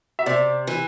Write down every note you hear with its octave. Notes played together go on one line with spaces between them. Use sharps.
E5
C3 D5
E3